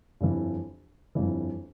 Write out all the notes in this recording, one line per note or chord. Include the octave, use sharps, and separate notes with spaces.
G1 F2 E3
G1 F2 E3